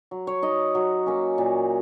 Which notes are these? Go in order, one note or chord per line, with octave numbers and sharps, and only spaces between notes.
F#3
C#5
D#4 D#5
F#3
A#3 C#4
A#2